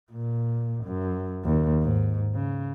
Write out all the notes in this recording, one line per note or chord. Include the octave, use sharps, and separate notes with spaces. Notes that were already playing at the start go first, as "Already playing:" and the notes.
A#2
F#2
D#2
G#2
C#3